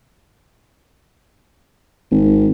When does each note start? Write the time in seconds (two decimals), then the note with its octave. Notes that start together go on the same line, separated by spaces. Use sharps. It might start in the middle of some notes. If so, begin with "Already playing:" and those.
2.11 G#1